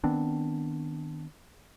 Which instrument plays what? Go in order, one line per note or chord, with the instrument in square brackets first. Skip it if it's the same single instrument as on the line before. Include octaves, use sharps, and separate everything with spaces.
[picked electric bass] D#3 B3 C4 D4